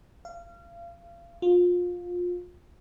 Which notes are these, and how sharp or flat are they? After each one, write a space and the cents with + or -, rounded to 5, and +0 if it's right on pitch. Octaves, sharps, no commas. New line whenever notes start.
F5 -30
F4 +25